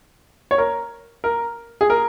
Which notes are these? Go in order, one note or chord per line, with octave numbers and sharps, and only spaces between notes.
C#5
A#4
A#4
G#4
A#4